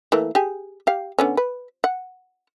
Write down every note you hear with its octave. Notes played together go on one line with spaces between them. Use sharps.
E3 A3 A#3
G4 G#4
G4 F5
D3 B3 C#4
B4
F#5